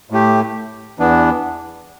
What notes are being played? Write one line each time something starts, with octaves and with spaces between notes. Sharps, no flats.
A2 A3 G4
E2 E3 B3 D4